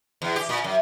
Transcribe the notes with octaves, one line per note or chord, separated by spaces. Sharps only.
E2
G4
A#2
F#2